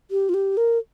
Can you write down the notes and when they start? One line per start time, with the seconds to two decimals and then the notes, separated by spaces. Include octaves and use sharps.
0.11 G4
0.29 F4
0.34 G4
0.57 A#4